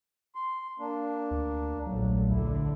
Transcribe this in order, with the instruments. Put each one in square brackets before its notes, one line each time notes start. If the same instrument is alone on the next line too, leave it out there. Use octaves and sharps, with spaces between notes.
[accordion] C6
A#3 D4
[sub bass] D2
[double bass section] A#1 A3 [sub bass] F#3
[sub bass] D2 [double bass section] D3 [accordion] E4